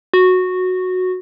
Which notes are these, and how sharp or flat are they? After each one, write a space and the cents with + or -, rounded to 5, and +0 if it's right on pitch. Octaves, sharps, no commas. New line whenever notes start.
F#4 -10